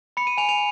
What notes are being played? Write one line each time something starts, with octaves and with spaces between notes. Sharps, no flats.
B5 C#7
D#7
G#5 F7
F7